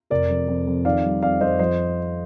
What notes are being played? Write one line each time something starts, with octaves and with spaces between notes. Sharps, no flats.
F1 A#4 D5
F2
F2
F2
D#3 D5 F5
G3
F2 D5 F5
F2 C5 D#5
F3 C5 D#5